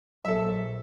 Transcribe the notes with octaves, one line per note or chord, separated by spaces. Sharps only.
A#1 F#3 A4 E5